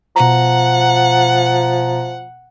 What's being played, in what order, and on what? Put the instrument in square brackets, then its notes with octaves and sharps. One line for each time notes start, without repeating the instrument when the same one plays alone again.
[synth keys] B2 A#5 [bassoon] F3 [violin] F#5